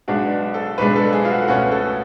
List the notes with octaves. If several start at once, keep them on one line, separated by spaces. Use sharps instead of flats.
B1 B2 G#3 D4 F#4
A4
B1 B2 G#3 D4 B4
A4
G#4
F4
F#4
C#2 B2 A3 C#4 F#4
A4